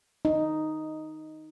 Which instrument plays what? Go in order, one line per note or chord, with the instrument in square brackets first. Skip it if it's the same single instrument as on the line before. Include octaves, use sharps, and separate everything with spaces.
[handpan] D#4